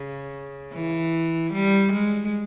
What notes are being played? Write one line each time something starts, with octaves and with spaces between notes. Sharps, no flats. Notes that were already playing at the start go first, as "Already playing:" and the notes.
Already playing: C#3
E3
G3
G#3